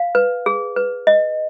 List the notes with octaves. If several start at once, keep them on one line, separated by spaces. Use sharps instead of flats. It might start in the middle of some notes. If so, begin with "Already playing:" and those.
Already playing: F5
B4
G#4
B4
D#5